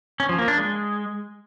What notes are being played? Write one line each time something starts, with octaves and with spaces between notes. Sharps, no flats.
C#4
F3
A#3
D4
G#3